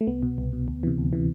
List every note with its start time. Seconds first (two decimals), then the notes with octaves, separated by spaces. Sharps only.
0.01 A3
0.07 C2 B3
0.23 B2
0.38 C2
0.53 B2
0.68 D2
0.83 C3 E3
0.98 D2
1.13 C3 E3